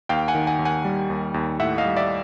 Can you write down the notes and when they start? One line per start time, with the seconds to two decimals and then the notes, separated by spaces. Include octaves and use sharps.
0.09 D#2 F5 G5
0.28 F#5 G#5
0.35 D#3
0.47 F#5 G#5
0.59 D#2
0.65 F#5 G#5
0.85 G3
1.10 D#2
1.34 D#2
1.59 A2 E5 F#5
1.78 D#5 F5
1.85 G3
1.97 D5 E5